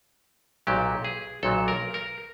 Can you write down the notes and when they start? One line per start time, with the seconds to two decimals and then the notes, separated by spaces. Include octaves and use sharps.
0.67 B1 A#2 F#3 G4
1.05 G#4
1.43 B1 A#2 F#3 A4
1.68 A#4
1.94 A#4